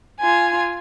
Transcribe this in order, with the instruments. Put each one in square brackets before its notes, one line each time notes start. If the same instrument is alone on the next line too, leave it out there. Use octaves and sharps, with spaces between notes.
[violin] F4 G#5